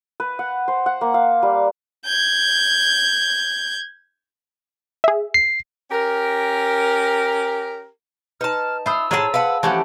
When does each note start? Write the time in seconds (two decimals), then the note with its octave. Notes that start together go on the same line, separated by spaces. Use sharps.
0.20 B4
0.39 F#5
0.68 C5
0.86 F#5
1.01 A#3
1.14 F5
1.42 G3
2.05 G6 G#6
5.04 G#4 E5
5.34 C7
5.91 C#4 G4 A#4
8.41 D#4 B4 A5 F6
8.86 F4 C5 E5 B5 D#6 E6
9.11 A2 F4 F#4 G#4 C#5 A5 A#5
9.34 B4 D#5 F5 F#5 A5
9.63 E3 F3 A3 C#4 G4 F#5